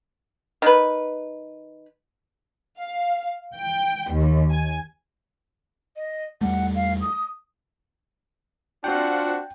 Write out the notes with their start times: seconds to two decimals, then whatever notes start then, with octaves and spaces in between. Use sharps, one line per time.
0.62 D#3 B4
2.79 F5
3.55 G5
4.12 D#2
4.51 G#5
5.96 D#5
6.41 E2 G3 A3 F#5
6.75 F5
7.00 D#6
8.84 C4 D4 F4 F#4 F#5 G5